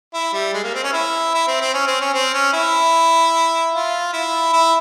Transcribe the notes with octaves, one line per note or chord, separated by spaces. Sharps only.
E4
G3
G#3
A#3
C4
C#4
E4
E4
C4
C4
C#4
C4
C#4
C4
C#4
E4
F4
E4
E4